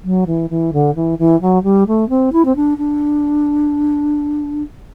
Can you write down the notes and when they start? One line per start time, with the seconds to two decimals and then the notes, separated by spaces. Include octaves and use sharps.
0.04 F#3
0.26 E3
0.50 E3
0.73 D3
0.95 E3
1.18 E3
1.41 F#3
1.63 G3
1.87 A3
2.09 C4
2.32 E4
2.45 C4
2.55 D4
2.78 D4